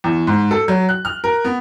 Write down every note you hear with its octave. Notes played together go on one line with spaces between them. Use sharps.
E2
G#2
A4
F#3
F#6
F6
A#4
B3